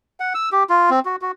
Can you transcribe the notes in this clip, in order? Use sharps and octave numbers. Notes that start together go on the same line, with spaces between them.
F#5
E6
G4
F4
C4
F#4
F#4